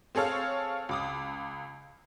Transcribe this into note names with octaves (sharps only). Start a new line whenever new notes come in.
C4 G#4 A4 C#5 F5
C#2 D6 D#6